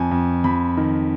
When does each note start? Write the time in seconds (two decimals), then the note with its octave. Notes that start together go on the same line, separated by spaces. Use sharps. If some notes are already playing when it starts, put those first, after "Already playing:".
Already playing: F2 G#5
0.11 F2
0.44 F2 B5
0.77 D#3